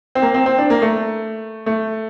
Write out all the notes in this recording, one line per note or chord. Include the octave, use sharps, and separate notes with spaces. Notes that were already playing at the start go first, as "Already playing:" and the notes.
C4
A#3
C4
C4
D4
A#3
A3
A3